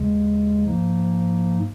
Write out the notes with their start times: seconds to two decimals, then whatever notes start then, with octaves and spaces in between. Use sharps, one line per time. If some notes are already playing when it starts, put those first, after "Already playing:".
Already playing: D#2 C#3 G#3
0.65 G#2 F3 A#3 D#4